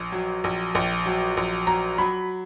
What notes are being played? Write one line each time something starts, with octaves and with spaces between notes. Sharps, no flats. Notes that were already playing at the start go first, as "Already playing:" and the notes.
Already playing: A#1
F#3
A#1
A#1
F#3
A#1
F#3 A#5
F#3 B5